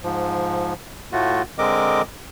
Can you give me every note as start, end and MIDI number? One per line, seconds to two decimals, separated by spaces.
0.03 0.73 44
0.03 0.73 53
1.13 1.42 45
1.13 1.42 57
1.13 1.42 65
1.13 1.42 66
1.58 2.02 50
1.58 2.02 56
1.58 2.02 60
1.58 2.02 70
1.58 2.02 75
1.58 2.02 86